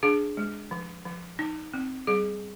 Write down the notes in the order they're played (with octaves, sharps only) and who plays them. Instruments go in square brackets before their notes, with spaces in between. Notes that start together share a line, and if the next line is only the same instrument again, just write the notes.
[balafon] D4 G#4
G#3
F3
F3
D#4
C4
G3 G#4